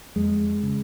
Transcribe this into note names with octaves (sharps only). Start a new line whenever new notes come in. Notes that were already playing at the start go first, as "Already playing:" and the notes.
F2 G#3
C#3